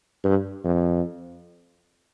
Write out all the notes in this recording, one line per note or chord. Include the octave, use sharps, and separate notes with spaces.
G2
F2